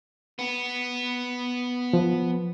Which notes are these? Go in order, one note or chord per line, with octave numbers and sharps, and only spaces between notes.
B3
F3